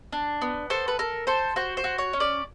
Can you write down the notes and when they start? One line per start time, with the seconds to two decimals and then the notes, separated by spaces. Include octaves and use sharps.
0.12 D4
0.42 B3
0.70 A4 C5
0.88 B4
0.99 A4 A#4
1.27 A4 C5
1.56 F#4 C5
1.77 C5
1.84 F#4
1.98 C#5
2.13 C#4
2.20 D5